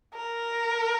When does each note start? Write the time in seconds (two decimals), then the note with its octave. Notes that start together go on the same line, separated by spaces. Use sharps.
0.14 A#4